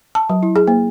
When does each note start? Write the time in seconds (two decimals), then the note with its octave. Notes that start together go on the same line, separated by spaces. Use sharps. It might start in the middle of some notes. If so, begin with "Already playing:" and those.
0.15 A5
0.30 F#3
0.43 E4
0.56 G#4
0.68 A#3